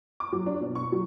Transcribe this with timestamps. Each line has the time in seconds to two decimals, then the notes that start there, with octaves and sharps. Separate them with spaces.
0.20 D6
0.33 F#3
0.46 D4
0.61 B2
0.75 C#6
0.92 F#3